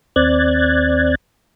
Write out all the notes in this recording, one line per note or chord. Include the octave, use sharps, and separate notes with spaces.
D#2 C4 D5 F#6 G#6 A6